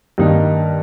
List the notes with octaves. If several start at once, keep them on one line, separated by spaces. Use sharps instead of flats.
G2 D#3 A#3 D#4